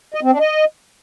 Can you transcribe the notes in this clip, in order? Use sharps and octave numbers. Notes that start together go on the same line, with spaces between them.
D#5
C4
D4
D#5